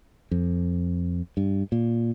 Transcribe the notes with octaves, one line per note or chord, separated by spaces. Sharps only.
F2
G2
A#2